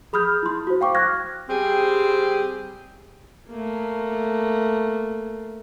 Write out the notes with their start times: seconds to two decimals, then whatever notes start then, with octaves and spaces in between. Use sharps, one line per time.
0.13 G#4 B5 D#6 F6 G6
0.43 E4 C6
0.67 F#4 C5
0.81 F5 G5 C#6 D6
0.95 F6 F#6 G#6 A#6
1.49 G3 C4 G4 G#4
3.48 A3 A#3